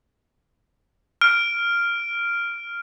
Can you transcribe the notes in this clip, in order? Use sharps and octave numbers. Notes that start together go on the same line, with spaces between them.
F6 D7